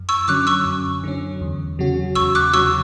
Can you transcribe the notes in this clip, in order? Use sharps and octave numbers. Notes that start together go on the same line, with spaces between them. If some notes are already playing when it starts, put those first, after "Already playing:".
Already playing: F#2
C#6 E6
D3 F#3 C#4 D6 F#6
C#6 E6
F#2
D3 F#3 C#4
E2
C#3 F#3 C#4 F#4
E2 C#6 E6
D6 F#6
C#3 F#3 C#4 F#4 C#6 E6